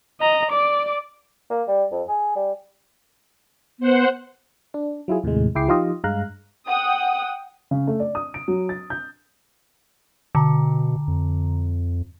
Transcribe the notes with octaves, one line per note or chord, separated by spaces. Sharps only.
D#5 A#5
D5 D6
A#3
G3
F2
G#4
G3
B3 C5 F#5
D4
F#3 E4 F4 G#4
D#2 A2 C3 G#3
C#2 E4 G#4 G5 D6 C7
F3 D#4 F4 G4 D#5
G2 G#3 F5 A#5 F#6
F#5 G5 D#6
C#3
A3
D5
D#6
D7
F#3
A6
G6
B2 D3 A#5
F2